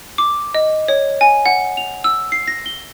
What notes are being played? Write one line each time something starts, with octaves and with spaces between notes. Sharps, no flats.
D6
D#5
C#5
G#5
F#5
F7
E6
C7
A#6
G7